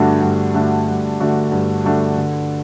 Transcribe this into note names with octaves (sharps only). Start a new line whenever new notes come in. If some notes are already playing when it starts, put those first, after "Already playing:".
Already playing: G2 D3 A3 D4 F#4
G2
D3 A3 D4 F#4
G2
D3 A3 D4 F#4
G2
D3 A3 D4 F#4
D3